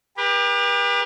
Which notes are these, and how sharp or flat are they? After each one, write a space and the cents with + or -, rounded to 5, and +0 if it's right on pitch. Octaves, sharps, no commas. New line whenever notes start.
G4 +30 B4 -40